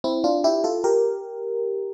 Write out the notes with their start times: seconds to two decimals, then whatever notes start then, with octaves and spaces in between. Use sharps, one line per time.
0.04 C4 E4
0.24 D4 F4
0.44 E4 G4
0.64 F4 A4
0.84 G4 A#4